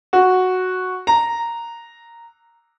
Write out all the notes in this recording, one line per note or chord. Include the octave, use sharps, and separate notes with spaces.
F#4
A#5